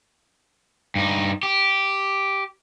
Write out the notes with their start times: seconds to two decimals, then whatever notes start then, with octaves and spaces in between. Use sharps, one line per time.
0.95 G2 D#4
1.43 G4